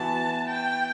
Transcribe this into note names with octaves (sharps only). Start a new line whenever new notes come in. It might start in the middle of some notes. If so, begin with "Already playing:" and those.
Already playing: E3 B3 F#4 A5
G5